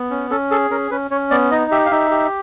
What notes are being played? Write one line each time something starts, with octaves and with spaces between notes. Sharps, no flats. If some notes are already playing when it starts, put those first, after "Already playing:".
Already playing: B3
C#4
C#4 A4
G#4 A4
C#4 A#4
C#4 B4
C#4 C#5
B3 D5
D#4 D#5
G4 E5
F5
D#4 E5
G4